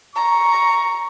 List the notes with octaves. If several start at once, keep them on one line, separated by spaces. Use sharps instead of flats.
A#5 C#6